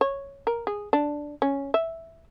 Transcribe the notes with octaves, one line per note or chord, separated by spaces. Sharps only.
C#5
A#4
G#4
D4
C#4
E5